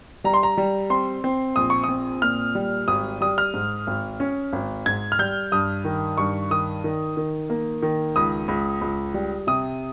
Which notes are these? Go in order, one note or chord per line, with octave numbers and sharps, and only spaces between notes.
G3 A#5
C6
A#5
G3
C4 C6
C4
A#1 D#6
C#6
D#6
C4
A#2 F6
G3
G#1 D#6
G3 D#6
F6
G#2
G#1
C#4
G#1
G#2 G#6
F6
G3 G6
G2 D#6
D#3
G2 C#6
D#3 D#6
D#3
D#3
A#3
D#3
C#2 D#6
C#2
C#2
G3
C3 D#6